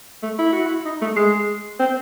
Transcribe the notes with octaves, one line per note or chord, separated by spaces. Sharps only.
A3
E4
F#4
E4
D#4
A3
G#3
C4